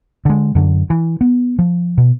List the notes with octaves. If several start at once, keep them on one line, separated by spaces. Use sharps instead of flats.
D3 G#3
F#2 D3
E3
B3
F3
B2